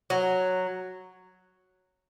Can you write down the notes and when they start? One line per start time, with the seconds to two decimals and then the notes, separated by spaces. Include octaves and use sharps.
0.10 F#3